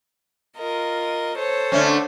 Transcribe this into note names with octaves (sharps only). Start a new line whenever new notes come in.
F4 A#4 D#5
A4 C5 C#5
D3 A3 C#4